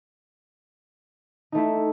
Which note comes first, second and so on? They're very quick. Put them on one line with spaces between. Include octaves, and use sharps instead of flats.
D#4 A3 E4